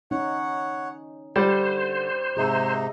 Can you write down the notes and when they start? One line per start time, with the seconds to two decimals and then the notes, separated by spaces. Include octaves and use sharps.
0.11 C#4 D#4 C#5 F#5
1.36 D3 G3 C5
2.37 G#2 C3 D#4 G#4 D#5 E5